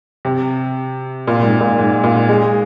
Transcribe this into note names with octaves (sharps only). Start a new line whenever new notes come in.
C3
A#2
G#2
A#2
G#2
A#2
G#3